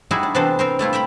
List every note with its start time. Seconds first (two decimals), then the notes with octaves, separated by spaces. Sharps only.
0.11 G3 D#4 E4 F#4 G#4 E5
0.23 D4
0.35 C3 E3 B3 D4 A4 C5
0.59 C4 A#4 C5
0.79 G3 A3 E4 F4
0.93 E5 G5 A#5 B5